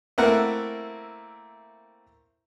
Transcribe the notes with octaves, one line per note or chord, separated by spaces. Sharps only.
A3 A#3 C4 E4 A#4 F#5